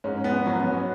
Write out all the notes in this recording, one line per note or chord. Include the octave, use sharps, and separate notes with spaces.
G#2 C#4
B3
F#3 C#4
B3
C#4